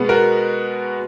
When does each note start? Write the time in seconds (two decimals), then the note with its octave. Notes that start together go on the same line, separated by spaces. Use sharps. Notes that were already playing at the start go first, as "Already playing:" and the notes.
Already playing: B2 G#3 B3
0.09 F#4 A#4